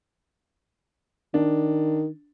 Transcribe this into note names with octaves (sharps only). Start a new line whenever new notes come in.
D#3 D4